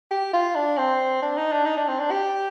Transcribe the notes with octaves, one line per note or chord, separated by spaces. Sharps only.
G4
F4
D4
C4
D4
D#4
D4
D#4
D4
C4
D4
G4